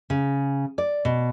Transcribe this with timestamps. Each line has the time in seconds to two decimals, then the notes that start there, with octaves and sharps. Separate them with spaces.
0.10 C#3
0.78 D5
1.05 B2